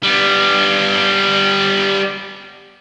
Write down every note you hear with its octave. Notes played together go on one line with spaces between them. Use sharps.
G3 B3